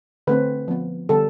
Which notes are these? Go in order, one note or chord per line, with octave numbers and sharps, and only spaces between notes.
D3 A3 C4 B4
F3 B3
D3 G3 B3 A4